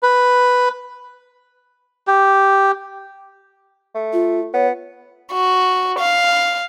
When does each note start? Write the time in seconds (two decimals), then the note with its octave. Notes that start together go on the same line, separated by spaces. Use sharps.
0.03 B4
2.07 G4
3.95 A3
4.13 F4
4.54 B3 C#5
5.33 F#4
5.99 F5